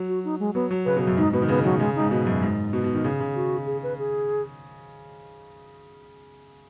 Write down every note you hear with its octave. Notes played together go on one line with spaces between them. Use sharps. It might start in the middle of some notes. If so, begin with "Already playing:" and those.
Already playing: F#3
F#4
D#4
G#3
F#3 B3
F#3
C#3 B4
B2
F#2
G#2 D#4
B2 B3
D#3
C#3 B3
D#3 F#3
B2
C#3 G#3
G#2 D#4
B2
F#2
G#2
B2
B2
D#3
C#3
C#3
F#4
G#4
B4
G#4